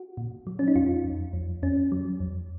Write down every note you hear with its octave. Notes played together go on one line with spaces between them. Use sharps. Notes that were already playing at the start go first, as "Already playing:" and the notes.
Already playing: F#4
A#2
F#3
C#4
D#4
F2 F4
F2
F2
F2 C#4
F#3
F2